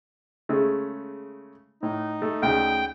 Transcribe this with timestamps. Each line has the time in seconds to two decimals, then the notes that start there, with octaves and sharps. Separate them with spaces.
0.49 C#3 G#3 A3
1.83 A2 D#4
2.22 A3
2.42 D2 C#3 G5